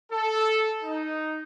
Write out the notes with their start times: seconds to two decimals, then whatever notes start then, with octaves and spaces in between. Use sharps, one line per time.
0.12 A4
0.83 D#4